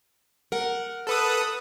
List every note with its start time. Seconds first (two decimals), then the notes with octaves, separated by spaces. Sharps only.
0.52 A#4 F#5
1.07 A4 B4 D#6